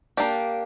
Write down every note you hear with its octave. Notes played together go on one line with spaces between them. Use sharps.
A#3 D4 G4